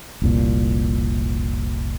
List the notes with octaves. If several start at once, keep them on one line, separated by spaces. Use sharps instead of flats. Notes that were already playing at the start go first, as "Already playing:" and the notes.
F1 C2 A#2